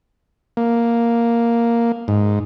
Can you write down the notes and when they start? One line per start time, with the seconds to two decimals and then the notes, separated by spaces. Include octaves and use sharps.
0.57 A#3
2.08 G#2